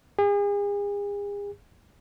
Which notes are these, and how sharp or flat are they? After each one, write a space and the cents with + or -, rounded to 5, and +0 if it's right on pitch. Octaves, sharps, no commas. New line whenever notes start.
G#4 -40